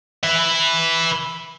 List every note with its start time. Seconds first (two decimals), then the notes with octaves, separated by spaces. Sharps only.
0.23 B4 E5